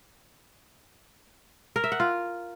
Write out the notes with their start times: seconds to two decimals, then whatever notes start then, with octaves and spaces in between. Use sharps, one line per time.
1.76 A#4
1.84 E5
1.92 F#5
2.00 F4